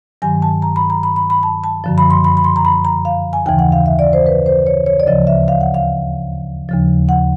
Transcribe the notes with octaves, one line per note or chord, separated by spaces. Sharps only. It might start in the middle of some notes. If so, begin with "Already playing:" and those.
G2 D#3 F#3 G#5
A5
A#5
B5
A#5
B5
B5
B5
A5
A5
F#2 D3 F3
B5
C6
B5
B5
C6
A#5
B5
A#5
F5
G#5
D#2 C#3 E3 G5
F#5
F5
E5
D5
C5
B4
C5
C#5
C#5
D5
D2 C#3 F3 D#5
E5
F5
F#5
F5
D#2 C#3 F3
F#5